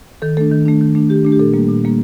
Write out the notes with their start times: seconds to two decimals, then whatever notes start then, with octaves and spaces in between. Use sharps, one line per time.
0.22 D#3 A4
0.37 A3 D4 A4
0.52 D#3
0.66 A3 D4
0.81 D#3
0.95 A3 D4
1.09 D#3 G4
1.25 A3 D4
1.32 G4
1.39 A#2 A4
1.54 G3 A#3
1.68 A#2
1.84 G3 A#3